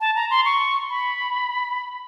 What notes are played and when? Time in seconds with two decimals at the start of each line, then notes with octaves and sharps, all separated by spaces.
0.01 A5
0.16 A#5
0.30 C6
0.45 C#6
0.90 B5